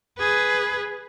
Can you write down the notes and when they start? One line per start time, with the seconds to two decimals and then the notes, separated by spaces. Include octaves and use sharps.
0.18 G#4 B4